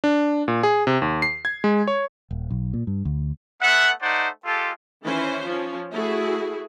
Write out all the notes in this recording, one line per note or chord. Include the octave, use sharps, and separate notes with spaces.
D4
A#2
G#4
C3
D#2
C7
G#6
G#3
C#5
D#1
B1
A#2
G2
D2
A3 B3 E5 F#5
A3 D#4 C5 D5 F#5
G#3 F4 G4 A4
D#3 E3 C#4 B4 C5
F3 C#4
A3 E4 F#4 G#4